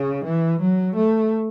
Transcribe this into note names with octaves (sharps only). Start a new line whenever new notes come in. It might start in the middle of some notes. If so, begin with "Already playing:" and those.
Already playing: C#3
E3
F#3
A3